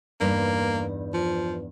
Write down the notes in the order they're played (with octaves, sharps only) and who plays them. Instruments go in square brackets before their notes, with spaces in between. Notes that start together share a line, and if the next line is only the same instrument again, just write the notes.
[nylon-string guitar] E2 G2 D#4 [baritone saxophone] A#3
[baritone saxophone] F3